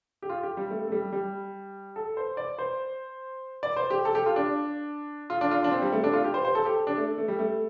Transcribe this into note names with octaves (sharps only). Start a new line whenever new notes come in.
G4
F4
G4
G3
A3
A3
G3
G3
A4
C5
D5
C5
D5
C5
G4
A4
G4
F4
D4
F4
D4
F4
D4
C4
G3
A3
D4
F4
G4
C5
C5
A4
G4
D4
A3
A3
G3
A3